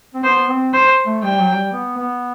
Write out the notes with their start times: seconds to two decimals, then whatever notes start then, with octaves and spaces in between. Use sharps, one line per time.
0.15 C4
0.23 B3 C5
0.48 C4
0.74 C5
1.06 A3
1.24 G3 G5
1.40 F#3
1.56 G3
1.73 B3
1.98 B3